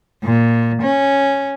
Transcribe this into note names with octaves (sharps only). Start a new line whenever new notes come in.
A#2
C#4